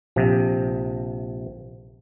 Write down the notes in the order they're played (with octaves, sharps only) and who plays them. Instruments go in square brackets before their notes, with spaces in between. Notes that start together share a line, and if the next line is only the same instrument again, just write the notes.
[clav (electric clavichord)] A#1 C3